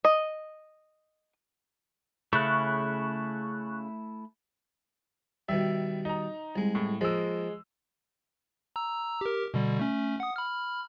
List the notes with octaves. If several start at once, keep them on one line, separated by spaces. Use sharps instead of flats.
D#5
C#3 A3 E4 C#6 F#6
B2 D#3 G3 E5
D#4 A#5
C2 G#3
A2
F3 G#3 A#3 E6
A#5 E6
G4 A#4
B2 D3 G3
A3 C#4
F#5 D#6
B5 F6